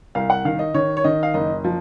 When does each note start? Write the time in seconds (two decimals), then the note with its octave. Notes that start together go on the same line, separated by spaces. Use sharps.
0.15 C2 F5
0.30 F#5
0.45 D#3 F5
0.59 D#5
0.74 D#3 C#5
0.97 C#5
1.04 D#3 D#5
1.23 F5
1.34 F#1 D#5
1.64 F3